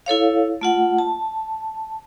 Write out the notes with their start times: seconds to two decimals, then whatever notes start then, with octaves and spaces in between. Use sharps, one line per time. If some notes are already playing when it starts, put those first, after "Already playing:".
0.06 E4 A4 C#5 F5
0.61 A3 F4 F#5
0.98 A5